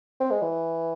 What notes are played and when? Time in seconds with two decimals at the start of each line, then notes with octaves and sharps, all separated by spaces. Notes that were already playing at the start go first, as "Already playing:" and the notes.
0.20 C4
0.30 G#3
0.42 E3